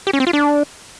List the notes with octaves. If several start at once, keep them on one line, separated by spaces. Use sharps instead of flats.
G4
C#4
C4
F4
D4